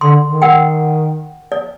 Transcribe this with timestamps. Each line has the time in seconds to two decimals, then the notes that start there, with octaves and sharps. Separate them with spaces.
0.01 D3 C6
0.24 D#3
0.42 A#4 F#5 G5
1.52 D5